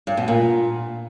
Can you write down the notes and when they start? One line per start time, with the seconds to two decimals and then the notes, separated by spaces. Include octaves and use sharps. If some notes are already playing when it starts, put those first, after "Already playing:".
0.07 G2
0.17 B2
0.28 A#2